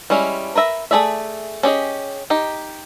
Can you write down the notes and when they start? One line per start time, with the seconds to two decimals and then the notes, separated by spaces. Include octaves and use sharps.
0.10 G3 G#3 C#4 E4
0.55 A#4 B4 E5 A#5
0.91 A3 D#4 G#4 D5 E5
1.63 C#4 G4 G#4 D#5
2.30 D#4 G4